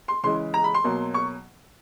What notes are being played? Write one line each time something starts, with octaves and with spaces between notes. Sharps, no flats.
C6
C#3 E3 G#3 C6
A#5
B5
C6
B2 F#3 A#3
C#6